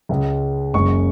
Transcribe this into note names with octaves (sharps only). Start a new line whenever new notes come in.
C#2 C#3 G#3
F#1 F#2 C#3 G#3 C#6